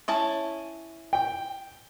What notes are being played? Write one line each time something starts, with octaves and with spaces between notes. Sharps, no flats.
C#4 E4 A5
G5